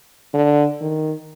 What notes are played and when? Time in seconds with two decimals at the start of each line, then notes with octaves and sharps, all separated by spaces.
0.34 D3
0.81 D#3